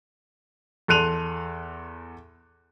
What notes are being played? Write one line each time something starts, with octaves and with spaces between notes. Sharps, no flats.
E2 A4 C6 F#6 D#7 F7